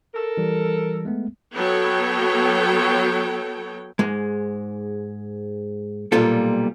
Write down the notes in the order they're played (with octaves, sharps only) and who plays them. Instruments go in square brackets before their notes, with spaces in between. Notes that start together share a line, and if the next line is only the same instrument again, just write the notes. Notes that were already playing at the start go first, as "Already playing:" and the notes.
[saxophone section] A4 A#4
[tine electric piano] E3 G3
G#3 A3 B3
[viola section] F#3 B3 A4 C#5 G5
[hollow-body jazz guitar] G#2 G#3
B1 A#2 G3 F4 A4